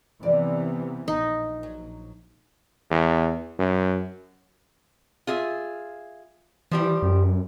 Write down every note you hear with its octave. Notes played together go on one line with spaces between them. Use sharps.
C3 E3 B3 D5
A#1 D#4
F#3
E2
F#2
F4 G#4 E5
E3 F3 G3 G4
F#2